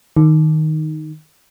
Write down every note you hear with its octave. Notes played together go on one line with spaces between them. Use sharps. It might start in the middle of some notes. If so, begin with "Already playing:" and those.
D#3